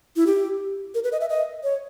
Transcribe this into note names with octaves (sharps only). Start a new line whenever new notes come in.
E4
G4
A#4
B4
D#5
E5
D#5
C#5